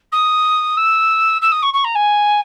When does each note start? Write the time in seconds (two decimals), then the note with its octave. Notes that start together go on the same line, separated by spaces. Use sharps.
0.12 D#6
0.77 E6
1.41 E6
1.51 D#6
1.62 C#6
1.73 C#6
1.84 A#5
1.95 G#5